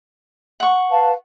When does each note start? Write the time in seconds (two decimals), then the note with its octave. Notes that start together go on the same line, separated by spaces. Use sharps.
0.60 F#5 C#6
0.90 B4 F5 A5